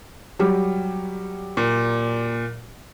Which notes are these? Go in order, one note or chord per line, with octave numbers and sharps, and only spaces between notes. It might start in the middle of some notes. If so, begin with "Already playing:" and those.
F#3 G3 G4
A#2